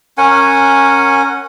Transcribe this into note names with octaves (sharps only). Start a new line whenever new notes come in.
C#4 A#4 F#5 G#5